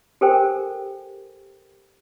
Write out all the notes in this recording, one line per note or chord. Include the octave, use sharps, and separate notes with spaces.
G4 A4 A#4 C5 G5 G#5